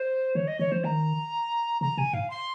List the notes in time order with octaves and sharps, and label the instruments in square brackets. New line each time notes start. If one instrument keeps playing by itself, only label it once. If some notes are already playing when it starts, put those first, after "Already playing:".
Already playing: [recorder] C5
[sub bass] D#3 [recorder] C#5
[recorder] D#5
[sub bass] D#3 [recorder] C#5
[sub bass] F3 [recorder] C5
[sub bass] D#3 [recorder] A#5
[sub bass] C#3 [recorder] A#5
[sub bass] C3 [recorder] G#5
[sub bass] G#2 [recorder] F5
[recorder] C6